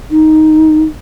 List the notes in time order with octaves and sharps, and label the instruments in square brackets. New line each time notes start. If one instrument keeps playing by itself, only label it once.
[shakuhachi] D#4